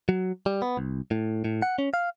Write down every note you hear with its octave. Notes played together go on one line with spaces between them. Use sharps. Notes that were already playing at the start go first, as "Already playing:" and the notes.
F#3
G3
B3
C2
A2
A2
F#5
C#4
F5